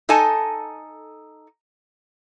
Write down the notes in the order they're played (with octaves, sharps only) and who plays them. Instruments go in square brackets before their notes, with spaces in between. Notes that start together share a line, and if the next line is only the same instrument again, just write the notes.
[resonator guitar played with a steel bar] D#4 A4 D#5 G#5 A5